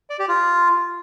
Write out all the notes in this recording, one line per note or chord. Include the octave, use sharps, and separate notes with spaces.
D5
G4
F4